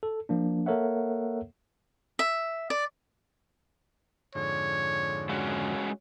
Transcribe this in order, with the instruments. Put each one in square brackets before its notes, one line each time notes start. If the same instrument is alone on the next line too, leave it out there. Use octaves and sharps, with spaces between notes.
[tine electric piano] A4
F3 A#3 D4
A#3 A4 A#4 C#5 E5 F#5
[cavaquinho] E5
D5
[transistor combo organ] F2 G#2 D3 [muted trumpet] C#5
[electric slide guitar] G#3 C#4 F#4